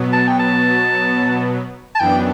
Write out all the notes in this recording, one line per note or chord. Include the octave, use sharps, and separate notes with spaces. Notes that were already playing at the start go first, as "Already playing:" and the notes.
Already playing: B2 F#3 B3
A5
G5
A5
A5
F#2 E3 B3 D4 G5